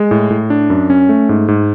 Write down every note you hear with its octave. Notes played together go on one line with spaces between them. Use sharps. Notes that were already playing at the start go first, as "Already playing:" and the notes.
Already playing: G#3
A2
A2
D4
F#2
C#4
A3
G#2
G#2